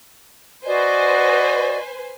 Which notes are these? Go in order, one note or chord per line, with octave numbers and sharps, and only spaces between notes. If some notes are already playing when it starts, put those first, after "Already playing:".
F#4 B4 C5 D5 D#5 G#5